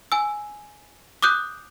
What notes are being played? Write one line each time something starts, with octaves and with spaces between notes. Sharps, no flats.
G#5 E6
D6 D#6 F#6 G6